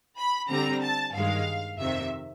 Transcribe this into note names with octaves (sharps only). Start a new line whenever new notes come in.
B5
D3 G3 C4 A#5
A5
G2 D#3 G#3 F5
F2 C3 D#3 E5